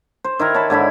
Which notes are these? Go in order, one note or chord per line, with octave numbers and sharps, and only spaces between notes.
C5
D#3 E4 A#4
C#5 A5 B5
G#2 D3 E4 B5